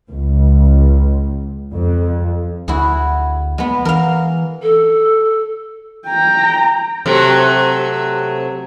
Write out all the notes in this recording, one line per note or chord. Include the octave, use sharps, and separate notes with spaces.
C#2
F2
D2 E4 F#4 G#4
G#3 B3
E3 A#4 F5
A4
G5 A#5
C3 F#3 A3